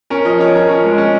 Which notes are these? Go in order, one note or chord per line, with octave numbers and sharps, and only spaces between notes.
C#4 A#4
F3 D#5
C#4 C#5
F3 A#4
C#4
G#3
C#4